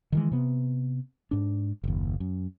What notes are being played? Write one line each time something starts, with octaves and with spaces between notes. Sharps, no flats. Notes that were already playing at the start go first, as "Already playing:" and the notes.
D#3 E3 G#3
C3 B3
G#2 D4
F#1 D#2
F#2